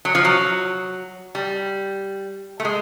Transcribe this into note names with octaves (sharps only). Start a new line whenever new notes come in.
F#3
F3
F#3
G3
A3
G#3